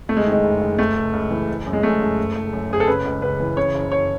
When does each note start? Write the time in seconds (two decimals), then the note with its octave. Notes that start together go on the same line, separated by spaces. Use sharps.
0.08 F#1 A3
0.17 G#3
0.26 D#3
0.32 G#3
0.44 F#1
0.61 F#1
0.78 C#2 A3
0.96 C#2
1.13 C#2
1.30 E3
1.48 F#1
1.66 F#2
1.73 G#3
1.83 F#1 A3
2.01 F#1
2.17 F#1
2.35 F#1
2.53 F#2
2.70 F#1 G#4
2.80 A4
2.87 C#3 B4
3.05 C#2
3.22 C#2 B4
3.40 E3
3.57 C#3 C#5
3.74 F#1
3.92 F#1 C#5